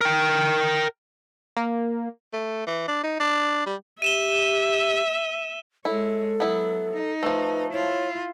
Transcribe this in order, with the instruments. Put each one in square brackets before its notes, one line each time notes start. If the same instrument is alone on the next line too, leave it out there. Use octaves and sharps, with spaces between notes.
[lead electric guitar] A#4 G5
[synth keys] A#3
[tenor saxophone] A3
E3
D4
D#4
D4
G3
[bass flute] G4 [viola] E5 [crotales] D#7 E7 G7
[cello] G#3 C#5 [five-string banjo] E4 [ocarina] A4
[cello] F#3 [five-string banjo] B3 E4
[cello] D#4
[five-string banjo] F3 A3 [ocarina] B4
[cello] E4 F4 [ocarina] C#5